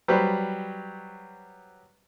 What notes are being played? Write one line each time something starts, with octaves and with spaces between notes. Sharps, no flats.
F#3 G3 B4 C5